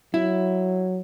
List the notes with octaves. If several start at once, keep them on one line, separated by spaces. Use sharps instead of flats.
F#3 E4